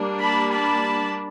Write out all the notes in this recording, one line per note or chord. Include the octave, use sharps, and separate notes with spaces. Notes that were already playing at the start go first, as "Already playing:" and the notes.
Already playing: G3 A#3 D4
A5 B5
A5 B5